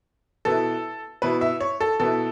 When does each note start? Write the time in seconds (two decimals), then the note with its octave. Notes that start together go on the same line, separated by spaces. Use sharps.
0.45 B2 B3 E4 A4
1.22 B2 B3 E4 B4
1.41 E5
1.60 C#5
1.80 A4
2.00 B2 B3 E4 A4